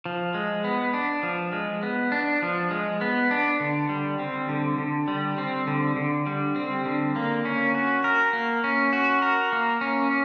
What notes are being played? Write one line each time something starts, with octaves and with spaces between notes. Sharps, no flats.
F3
G#3
B3
D4
F3
G#3
B3
D4
F3
G#3
B3
D4
D3
G3
C4
D3
D3
G3
C4
D3
D3
G3
C4
D3
A#3
C#4
F#4
A#4
A#3
C#4
F#4
A#4
A#3
C#4